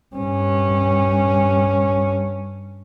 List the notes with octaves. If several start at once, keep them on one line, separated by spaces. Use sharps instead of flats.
G2 C#4